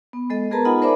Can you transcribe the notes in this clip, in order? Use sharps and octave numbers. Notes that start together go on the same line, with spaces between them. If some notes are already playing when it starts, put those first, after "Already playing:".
B3
G#3 A4 D#5
B3 G#4 A#4 B4 A5 A#5
D#4 F4 D#5 F#5 G#5 B5
A#4 C5 D5 E5 B5 D6